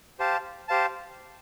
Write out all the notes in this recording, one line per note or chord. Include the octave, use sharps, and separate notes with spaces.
G4 C5 F5 A5
G4 C5 F5 A5